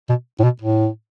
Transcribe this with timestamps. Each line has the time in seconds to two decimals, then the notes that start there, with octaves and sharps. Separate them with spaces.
0.10 B2
0.40 A2
0.44 B2
0.62 A2